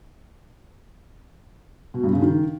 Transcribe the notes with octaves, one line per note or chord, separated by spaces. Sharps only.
B2
G2
C#3
D#3